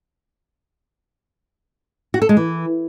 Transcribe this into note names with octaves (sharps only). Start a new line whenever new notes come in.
F#4
A4
G#3
E3